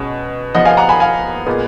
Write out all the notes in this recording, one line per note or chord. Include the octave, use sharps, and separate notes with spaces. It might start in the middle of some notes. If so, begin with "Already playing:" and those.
Already playing: B2 G#3 C#4
F3 B3 D#5 F#5
F5 G#5
F#5 A#5
G#5 B5
F5 G#5
A#2 G#3 B3